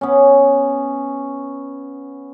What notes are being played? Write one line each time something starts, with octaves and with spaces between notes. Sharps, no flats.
B3 C#4